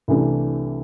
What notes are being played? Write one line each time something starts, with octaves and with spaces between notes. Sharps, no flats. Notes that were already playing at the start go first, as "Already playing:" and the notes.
C2 C3 E3 A3 D4